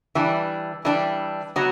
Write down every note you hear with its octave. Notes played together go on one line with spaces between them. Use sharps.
E3 G3 D4
E3 G3 D4
F#3 B3 F#4